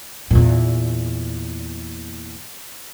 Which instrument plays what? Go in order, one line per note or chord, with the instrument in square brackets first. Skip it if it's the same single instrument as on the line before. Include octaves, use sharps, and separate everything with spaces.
[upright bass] E2 A#2